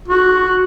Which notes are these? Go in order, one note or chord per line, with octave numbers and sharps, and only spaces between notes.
F#4